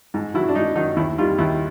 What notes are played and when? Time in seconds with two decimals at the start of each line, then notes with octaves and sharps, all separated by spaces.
0.14 G#2
0.34 D#3 F#3 E4
0.48 D4
0.55 G#2 D#4
0.75 D#3 F#3 D#4
0.96 D#2 E4
1.18 D#3 G3 F4
1.38 D#2 E4